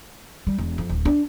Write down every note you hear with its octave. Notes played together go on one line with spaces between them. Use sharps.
G3
E1
F2
D1
D4